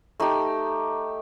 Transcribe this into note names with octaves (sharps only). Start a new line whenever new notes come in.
A3 D#4 G4